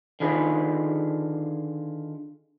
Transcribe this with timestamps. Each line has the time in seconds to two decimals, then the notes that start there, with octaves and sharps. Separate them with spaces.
0.20 D3 D#3 F4 G#4 B4